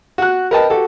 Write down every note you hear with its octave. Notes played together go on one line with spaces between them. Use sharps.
F#4 F#6
A#4 B4 D#5 G5 A5
F#4 G4 A4